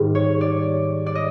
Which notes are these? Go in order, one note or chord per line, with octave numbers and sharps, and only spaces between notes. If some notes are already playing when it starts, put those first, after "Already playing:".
Already playing: G#2 D#3 G3 C4
C#5
D5
D5
D#5